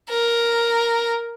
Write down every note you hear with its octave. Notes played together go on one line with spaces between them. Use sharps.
A#4